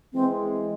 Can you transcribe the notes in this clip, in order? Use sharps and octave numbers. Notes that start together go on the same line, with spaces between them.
E3 G#3 C4